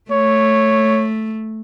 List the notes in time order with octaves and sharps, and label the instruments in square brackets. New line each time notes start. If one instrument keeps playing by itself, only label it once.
[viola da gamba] A3 [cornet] C#5